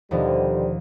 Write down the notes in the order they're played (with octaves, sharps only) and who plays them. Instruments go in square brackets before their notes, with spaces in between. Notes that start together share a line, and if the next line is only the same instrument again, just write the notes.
[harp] D#2 B2 F3 [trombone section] D3 G3 C5